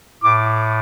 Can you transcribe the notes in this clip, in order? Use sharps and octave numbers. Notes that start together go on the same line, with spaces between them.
A2 D6